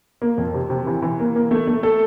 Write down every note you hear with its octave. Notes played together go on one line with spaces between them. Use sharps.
A#3
F2
C3
C3
E3
E3
A#3
A#3
A3
A3
A4